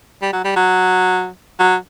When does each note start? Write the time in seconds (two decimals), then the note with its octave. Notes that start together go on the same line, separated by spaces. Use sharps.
0.22 G3
0.33 F#3
0.44 G3
0.56 F#3
1.59 F#3